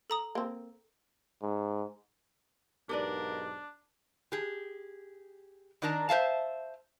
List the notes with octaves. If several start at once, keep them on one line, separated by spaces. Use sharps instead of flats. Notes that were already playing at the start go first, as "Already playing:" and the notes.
A4 A#5 D#6
A#3 C4
G#2
B1 G#2 D4 G4 A#4 B4 D5
G4 G#4
D#3 D4 A#4 D5 A5 A#5
C5 E5 F5 A5